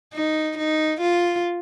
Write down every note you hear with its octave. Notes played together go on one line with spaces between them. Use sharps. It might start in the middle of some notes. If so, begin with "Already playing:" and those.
D#4
D#4
F4